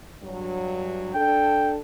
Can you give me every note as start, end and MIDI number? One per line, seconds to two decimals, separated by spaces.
0.23 1.11 43
0.23 1.11 54
1.14 1.79 62
1.14 1.79 69
1.14 1.72 79